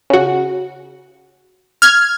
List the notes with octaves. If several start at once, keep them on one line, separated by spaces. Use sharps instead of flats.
C#3 F#4
F6 G#6